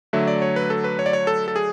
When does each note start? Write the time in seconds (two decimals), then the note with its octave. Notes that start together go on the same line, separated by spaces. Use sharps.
0.13 D3 F#3 A3 E5
0.28 D5
0.42 C#5
0.56 B4
0.70 A4
0.84 B4
0.99 C#5
1.06 D5
1.13 C#5
1.27 A4
1.48 A4
1.56 G#4